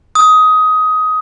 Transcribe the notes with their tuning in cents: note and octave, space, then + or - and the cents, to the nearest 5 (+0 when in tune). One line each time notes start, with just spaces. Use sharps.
D#6 +15